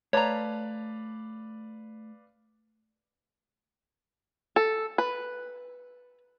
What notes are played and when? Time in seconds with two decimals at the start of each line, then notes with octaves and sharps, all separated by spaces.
0.13 A3 B4 C#5 D5 F5 A5 A#5
4.56 A4
4.98 B4